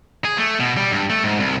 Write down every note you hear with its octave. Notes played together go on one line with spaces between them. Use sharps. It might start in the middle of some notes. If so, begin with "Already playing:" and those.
G#4
A3
B2
G3
G2
A3
G#2
C2